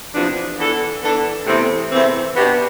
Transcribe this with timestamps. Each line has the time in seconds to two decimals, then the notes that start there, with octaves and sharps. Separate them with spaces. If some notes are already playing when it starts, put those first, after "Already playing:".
0.13 E2 C3 F3 B3 D4
0.57 E3 B3 D4 A4
1.01 E3 B3 D4 A4
1.46 E2 C3 E3 A3 C4
1.91 E2 C3 E3 A3 C4
2.35 B2 B3 D4 G4